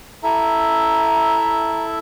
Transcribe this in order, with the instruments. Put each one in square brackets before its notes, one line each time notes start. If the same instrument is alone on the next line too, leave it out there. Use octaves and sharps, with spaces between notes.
[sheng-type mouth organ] E4 A4 E5 [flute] A#5